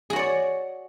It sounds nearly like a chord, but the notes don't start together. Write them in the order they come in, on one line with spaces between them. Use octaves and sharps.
G#4 F#4 C#5 D5